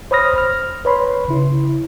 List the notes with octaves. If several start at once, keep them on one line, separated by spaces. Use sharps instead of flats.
C5 C#5 B5 D#6 F6 A#6
F6
B4 C#5 B5 C6
C#3 E4